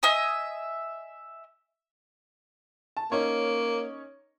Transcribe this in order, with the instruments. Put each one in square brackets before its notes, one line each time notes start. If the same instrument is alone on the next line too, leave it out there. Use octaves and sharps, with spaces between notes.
[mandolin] D#5 E5 G#5 D#6
[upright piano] A5
[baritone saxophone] A#3 [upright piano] C#4 D#4 C#5